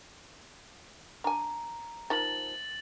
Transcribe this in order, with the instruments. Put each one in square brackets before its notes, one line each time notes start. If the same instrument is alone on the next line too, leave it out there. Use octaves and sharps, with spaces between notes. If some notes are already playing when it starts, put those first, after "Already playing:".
[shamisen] D4 G#5 [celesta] A#5
[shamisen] D#3 F3 [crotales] A6 F#7